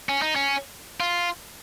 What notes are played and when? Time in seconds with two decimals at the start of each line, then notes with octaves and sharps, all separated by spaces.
0.09 C#4
0.22 D#4
0.36 C#4
1.00 F4